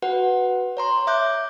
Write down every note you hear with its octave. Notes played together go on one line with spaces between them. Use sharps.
F#4 B4 F#5
C#5 A#5 C6
E5 D6 F#6 G6